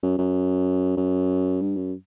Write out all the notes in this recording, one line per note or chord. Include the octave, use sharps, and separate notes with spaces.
F#2
F#2
F#2
G2
F#2